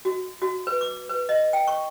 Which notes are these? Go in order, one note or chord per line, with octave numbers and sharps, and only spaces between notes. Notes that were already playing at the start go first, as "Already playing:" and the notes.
F#4
F#4
B4
D6
B4
D#5
G5
C#6